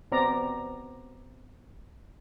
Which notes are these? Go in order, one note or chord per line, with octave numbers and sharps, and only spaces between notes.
B3 C4 D5 A#5